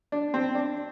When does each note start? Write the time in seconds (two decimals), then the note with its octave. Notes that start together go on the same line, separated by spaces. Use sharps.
0.12 D4
0.34 C4
0.55 D4